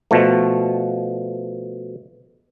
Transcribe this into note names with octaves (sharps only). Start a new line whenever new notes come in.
B2 F3 A3